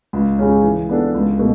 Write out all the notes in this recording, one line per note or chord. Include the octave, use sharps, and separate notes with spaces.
C#2
C#3 G#3 C#4
E3
B3 D4 A4
C#2
B2 A3